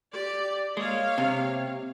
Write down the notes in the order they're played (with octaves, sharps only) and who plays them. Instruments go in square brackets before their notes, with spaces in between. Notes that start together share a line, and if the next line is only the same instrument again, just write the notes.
[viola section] G4 D5
[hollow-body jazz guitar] G#3 [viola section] A#3 C#5 F5
[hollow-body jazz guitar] C3